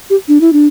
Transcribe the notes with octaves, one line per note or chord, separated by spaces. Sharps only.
G4
D4
E4
D4